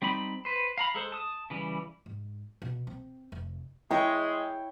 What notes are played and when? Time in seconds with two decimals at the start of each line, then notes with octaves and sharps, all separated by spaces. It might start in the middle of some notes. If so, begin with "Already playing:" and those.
0.02 G3 C4 D#4 B5
0.45 B4 C5
0.78 F5 A#5 B5
0.94 G#3 A4 C5
1.12 A5 D#6
1.50 C#3 E3 G3
2.06 G#2
2.62 B2
2.87 C4
3.32 F1
3.91 G#3 E4 C#5 G5